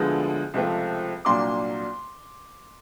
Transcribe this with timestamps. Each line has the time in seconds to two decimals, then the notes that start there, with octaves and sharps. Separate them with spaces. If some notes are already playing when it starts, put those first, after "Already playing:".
Already playing: D2 D3 F3 G#3 B3
0.54 C#2 C3 F3 A3 C4
1.25 C2 A#2 F#3 A#3 D4 C6 D6